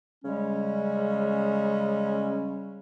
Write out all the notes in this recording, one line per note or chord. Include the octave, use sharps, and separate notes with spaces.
C#3 G3 G#3 C#4